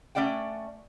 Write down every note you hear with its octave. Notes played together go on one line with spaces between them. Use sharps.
A3 C#4 D5 F#5 G5